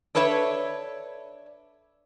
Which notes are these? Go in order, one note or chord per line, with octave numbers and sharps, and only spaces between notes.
D4 A4 B4 C#5 E5